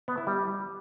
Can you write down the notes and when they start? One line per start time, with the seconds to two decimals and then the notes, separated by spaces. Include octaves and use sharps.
0.08 B3
0.17 E4
0.27 G3